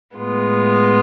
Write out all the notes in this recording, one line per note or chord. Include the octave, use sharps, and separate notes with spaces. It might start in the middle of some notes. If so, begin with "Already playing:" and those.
A2 G#3 B3 F4